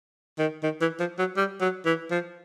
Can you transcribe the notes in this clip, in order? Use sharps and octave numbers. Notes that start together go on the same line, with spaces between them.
D#3
D#3
E3
F3
F#3
G3
F#3
E3
F3